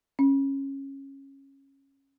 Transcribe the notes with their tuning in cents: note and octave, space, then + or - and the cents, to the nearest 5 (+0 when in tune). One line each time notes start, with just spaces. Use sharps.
C#4 -15